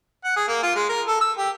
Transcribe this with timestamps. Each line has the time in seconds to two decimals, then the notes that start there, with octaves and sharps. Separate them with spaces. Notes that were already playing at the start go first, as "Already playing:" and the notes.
0.25 F#5
0.36 G#4
0.48 A#3
0.63 F4
0.76 G#3
0.89 A#4
1.07 A4
1.21 E6
1.38 G4